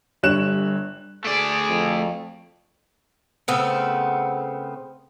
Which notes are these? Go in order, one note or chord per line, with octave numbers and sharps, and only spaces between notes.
G1 G2 C#5 F#6 E7
A3 G#4 D5
F2
C#3 A3 B3 C4